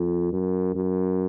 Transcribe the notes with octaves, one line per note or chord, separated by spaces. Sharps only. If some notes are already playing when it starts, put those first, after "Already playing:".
Already playing: F2
F#2
F#2